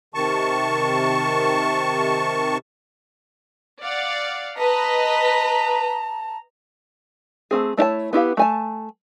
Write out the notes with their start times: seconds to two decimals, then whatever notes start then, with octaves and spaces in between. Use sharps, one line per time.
0.14 C3 D#3 A5 C#6
3.81 D5 F5 F#5
4.58 B4 D#5 A5 A#5 B6
7.51 A3 A#3 C4 G#4
7.77 A3 D4 E4 C#5 A5
8.13 B3 E4 G4 F5
8.37 A3 G#5 A5